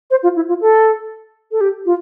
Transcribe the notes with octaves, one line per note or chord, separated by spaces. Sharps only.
C5
F4
E4
F4
A4
A4
G4
F4